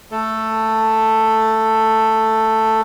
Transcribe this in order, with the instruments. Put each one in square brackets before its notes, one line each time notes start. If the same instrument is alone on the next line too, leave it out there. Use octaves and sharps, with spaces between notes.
[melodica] A3 A4